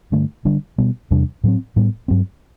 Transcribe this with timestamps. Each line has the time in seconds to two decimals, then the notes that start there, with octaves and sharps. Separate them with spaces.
0.12 G2 D3 A3
0.45 D3 G3 D4
0.78 B2 G3 B3
1.11 E2 C3 G3 D4
1.44 A2 F#3 C4
1.76 A2 G3 B3
2.08 G2 F#3 C4